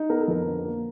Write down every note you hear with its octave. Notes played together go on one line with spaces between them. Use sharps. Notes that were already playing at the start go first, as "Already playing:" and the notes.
Already playing: D#4
B3 A#4
A4
F2 A#4
D3
A#3